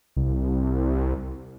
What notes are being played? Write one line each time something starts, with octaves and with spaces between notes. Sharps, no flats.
C2